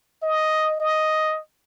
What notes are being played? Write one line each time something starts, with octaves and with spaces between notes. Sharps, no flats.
D#5
D#5